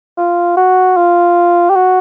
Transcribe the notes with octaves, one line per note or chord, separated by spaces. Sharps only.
F4
F#4
F4
G4
F#4